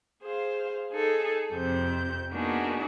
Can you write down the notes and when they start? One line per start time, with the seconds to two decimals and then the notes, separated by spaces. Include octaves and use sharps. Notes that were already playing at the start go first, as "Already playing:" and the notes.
0.22 G#4 C5 F5
0.93 D#4 G#4 A4
1.54 F2 C3 C4 G6
2.33 A#3 B3 D4 D#4 F#4 G#4